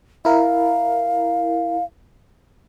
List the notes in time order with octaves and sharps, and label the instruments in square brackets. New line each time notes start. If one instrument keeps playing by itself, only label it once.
[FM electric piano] E4 A#4 [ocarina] F5